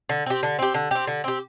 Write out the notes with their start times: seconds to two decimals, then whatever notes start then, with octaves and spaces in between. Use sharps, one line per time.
0.09 D3
0.26 C4 G4
0.43 D3
0.59 C4 G4
0.74 D3
0.91 C4 G4
1.07 D3
1.24 C4 G4